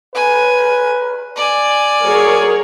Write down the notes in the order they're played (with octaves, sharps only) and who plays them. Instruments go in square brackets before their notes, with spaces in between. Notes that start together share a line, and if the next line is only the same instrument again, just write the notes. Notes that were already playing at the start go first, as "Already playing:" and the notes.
[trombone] B4 [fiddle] G#5
[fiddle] D5 G#5
[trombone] F#3 [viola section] G#4 A#4 C#5